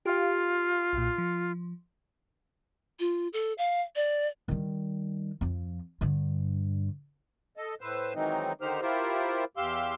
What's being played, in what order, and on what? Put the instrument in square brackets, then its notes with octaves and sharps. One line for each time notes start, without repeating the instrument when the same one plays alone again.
[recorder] F4 [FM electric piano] G4 F5
[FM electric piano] B1 A#2
F3
[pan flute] F4
A4
F5
D5
[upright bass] D#3 G3
F2 F3
G2 D3
[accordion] A4 D#5
A2 B4 C5 E6
D#3 E3 F#3 G#3 C4 D#4
D3 D#3 D#4 G4 C5 F6
E4 F4 G4 A#4 C5
E2 G4 F5 C6 E6